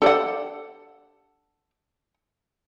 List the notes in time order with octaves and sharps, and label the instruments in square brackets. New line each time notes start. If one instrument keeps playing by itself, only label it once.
[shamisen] D4 G4 D5 [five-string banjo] A4 F#5